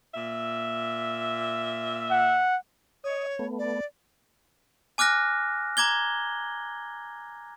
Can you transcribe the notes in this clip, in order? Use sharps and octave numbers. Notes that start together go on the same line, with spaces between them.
A#2 E5
F#5
C#5 D#5
A3 B3
D5
G#5 D6 F6 F#6 A#6
A#5 D6 G#6 G7